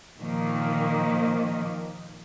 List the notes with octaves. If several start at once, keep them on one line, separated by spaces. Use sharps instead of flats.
A#2 D#3 F3 A#3